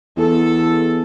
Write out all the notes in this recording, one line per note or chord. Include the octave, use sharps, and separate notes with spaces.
E2 A4